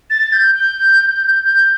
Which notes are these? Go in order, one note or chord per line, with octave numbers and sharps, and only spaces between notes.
A6
G6
G6
G6